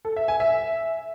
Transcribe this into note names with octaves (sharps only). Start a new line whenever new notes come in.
A4
E5
G#5
E5